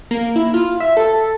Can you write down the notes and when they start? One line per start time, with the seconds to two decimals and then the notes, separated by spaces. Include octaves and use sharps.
0.11 A#3
0.36 E4
0.54 F4
0.80 E5
0.97 A4